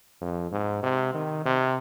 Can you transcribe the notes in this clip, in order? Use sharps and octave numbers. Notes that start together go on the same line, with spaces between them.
F2
G#2
C3
D#3
C3